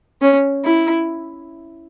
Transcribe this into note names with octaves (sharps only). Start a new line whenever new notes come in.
C#4
E4